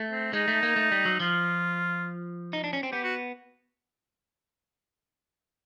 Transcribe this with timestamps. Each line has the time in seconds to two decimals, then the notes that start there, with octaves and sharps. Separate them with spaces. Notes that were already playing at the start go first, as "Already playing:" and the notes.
Already playing: A3
0.12 C4
0.33 G#3 D#4
0.48 A3
0.63 A#3
0.76 A3
0.92 G3
1.05 F#3
1.20 F3 F4
2.53 D#4
2.64 D4
2.73 C#4
2.83 C4
2.92 B3 G4
3.03 F#4